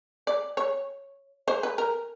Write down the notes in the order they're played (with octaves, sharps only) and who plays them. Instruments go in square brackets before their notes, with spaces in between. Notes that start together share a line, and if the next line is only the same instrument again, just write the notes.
[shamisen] D5
C#5
C5
B4
A#4